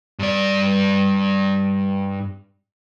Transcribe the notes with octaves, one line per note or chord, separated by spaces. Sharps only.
G2 D5